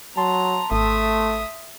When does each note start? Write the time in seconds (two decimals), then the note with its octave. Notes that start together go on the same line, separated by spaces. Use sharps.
0.17 F#3 A5 A#5 C6
0.71 G#1 A3 E5 D#6